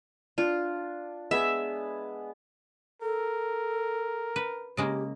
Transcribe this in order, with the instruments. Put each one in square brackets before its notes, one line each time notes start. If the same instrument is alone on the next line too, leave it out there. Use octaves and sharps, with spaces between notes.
[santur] D4 [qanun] F4
[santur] G#3 B3 G#5 [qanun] E5
[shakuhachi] A4 [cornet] A#4
[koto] B4
[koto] C#3 G#3 A#3 [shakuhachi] G4